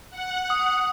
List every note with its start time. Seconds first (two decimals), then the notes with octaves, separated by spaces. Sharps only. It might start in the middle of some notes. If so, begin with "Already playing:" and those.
0.10 F#5
0.50 D#6